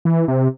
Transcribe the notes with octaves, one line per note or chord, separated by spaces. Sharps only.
E3
C3